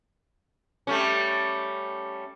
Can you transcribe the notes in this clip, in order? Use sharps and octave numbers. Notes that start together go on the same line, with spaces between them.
G3 A3 C#4